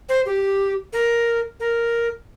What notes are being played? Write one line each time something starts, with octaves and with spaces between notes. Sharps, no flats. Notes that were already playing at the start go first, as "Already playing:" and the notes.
C5
G4
A#4
A#4